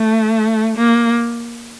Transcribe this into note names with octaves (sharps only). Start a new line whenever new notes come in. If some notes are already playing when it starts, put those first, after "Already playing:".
Already playing: A3
A#3